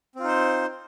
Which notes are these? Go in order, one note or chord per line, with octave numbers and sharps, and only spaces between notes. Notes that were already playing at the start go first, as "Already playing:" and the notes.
C4 D#4 F4 C5